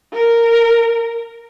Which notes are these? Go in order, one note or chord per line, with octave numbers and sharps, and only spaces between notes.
A#4